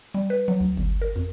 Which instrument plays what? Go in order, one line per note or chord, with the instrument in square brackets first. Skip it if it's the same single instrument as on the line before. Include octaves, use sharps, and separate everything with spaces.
[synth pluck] G3
B4
F#3
D2
G1
A#4
F2